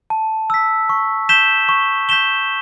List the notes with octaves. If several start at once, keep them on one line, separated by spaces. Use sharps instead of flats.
A5
E6 B6
C#6
G6 B6 E7 G7
C#6
G6 B6 E7 G7